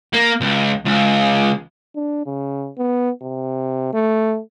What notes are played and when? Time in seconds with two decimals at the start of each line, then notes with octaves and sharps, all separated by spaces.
0.13 A#3
0.41 C#2
0.85 C#2
1.95 D4
2.26 C#3
2.78 B3
3.22 C3
3.93 A3